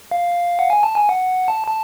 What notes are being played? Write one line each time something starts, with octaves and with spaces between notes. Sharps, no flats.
F5
F#5
G#5
A5
G#5
F#5
A5
A5